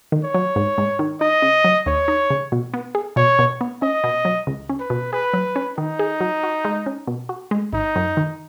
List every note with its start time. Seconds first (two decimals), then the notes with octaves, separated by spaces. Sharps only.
0.12 D#3
0.24 C#5
0.34 F#3
0.56 G#2
0.78 G#2
0.99 D#3
1.20 D#4 D#5
1.42 C#3
1.64 F#3
1.86 D#2 C#5
2.08 D#4
2.30 C#3
2.52 B2
2.74 B3
2.95 G#4
3.16 B2 C#5
3.39 B2
3.61 B3
3.82 C#4 D#5
4.04 B2
4.25 F#3
4.47 C#2
4.69 C#4
4.79 B4
4.90 B2
5.12 G#4 B4
5.34 F#3
5.56 C#4
5.77 D#3 D#4
5.99 G#4
6.20 F#3
6.43 F#4
6.65 G#3
6.86 C#4
7.07 B2
7.29 F#4
7.51 G#3
7.73 G#1 D#4
7.96 F#2
8.17 D#3